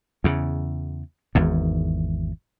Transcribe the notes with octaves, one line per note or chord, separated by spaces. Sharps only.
E2 C#3
G#1 E2 G#2